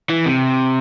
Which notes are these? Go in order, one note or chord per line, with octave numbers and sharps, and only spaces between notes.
E3
C3